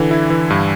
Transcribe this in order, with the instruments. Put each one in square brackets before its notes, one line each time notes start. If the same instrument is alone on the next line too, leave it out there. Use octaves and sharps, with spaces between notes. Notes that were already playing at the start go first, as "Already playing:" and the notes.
Already playing: [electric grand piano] D3 E3
E4
E3
G2